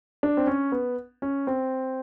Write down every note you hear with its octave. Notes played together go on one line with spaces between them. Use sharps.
D4
C4
C#4
B3
C#4
C4